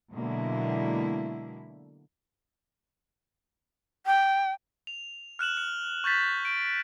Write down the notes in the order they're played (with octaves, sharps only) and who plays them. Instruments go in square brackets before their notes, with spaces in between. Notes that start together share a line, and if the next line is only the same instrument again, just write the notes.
[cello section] B2 D3 F#3 G#3 A#3 E4
[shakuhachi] G5
[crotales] F7
F6 F#6 E7 F#7
F6
C#6 G6 A6 B6
D7